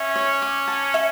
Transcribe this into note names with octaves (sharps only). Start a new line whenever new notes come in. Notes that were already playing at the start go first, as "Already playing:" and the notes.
Already playing: C#4 E5
C#5
D6
A5
E5